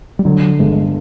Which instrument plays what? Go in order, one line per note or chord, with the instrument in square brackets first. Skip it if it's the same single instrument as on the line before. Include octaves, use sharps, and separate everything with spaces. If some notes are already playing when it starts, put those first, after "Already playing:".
[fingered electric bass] G3
[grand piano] D3 [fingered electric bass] F#3
[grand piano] G1 [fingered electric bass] G#3